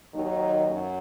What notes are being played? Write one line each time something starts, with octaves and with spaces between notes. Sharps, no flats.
D#2 D#3 F#3 D#4
F#2